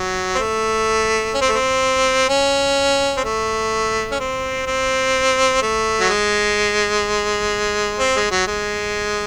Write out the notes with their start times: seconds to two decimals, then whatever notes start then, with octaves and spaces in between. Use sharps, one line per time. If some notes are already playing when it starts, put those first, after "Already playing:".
Already playing: F#3
0.35 C4
0.39 A3
1.34 C#4
1.41 C4
1.49 A3
1.55 C4
2.29 C#4
3.17 C4
3.24 A3
4.11 C#4
4.20 C4
4.66 C4
5.62 A3
6.00 F#3
6.09 G#3
7.99 C4
8.16 G#3
8.31 F#3
8.47 G#3